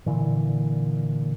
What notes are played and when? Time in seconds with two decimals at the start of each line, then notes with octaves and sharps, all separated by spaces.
0.06 A#2 D3 E3